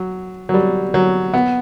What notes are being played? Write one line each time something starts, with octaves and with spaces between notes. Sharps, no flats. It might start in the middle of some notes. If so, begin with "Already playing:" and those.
Already playing: F#3
F#3
G3
F#3
B3